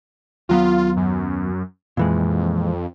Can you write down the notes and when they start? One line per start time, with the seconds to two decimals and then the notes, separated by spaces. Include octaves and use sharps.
0.49 D#2 F#3 B3 F4
0.97 F#2
1.97 F2 A#2 E3 G#3